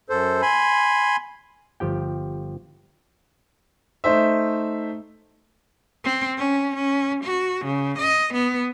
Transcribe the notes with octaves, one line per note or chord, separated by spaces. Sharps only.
F#2 A4 C5
G#5 B5 C6
G1 F3 G4 G5
A3 D#4 C5 E5
C4
C#4
C#4
F#4
C#3
D#5
B3